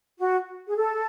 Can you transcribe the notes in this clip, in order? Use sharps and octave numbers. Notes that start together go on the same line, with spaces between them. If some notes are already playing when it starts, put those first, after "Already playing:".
F#4
G#4
A4